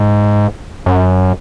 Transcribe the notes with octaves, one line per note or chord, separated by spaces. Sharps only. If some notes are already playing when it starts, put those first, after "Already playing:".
Already playing: G#2
F#2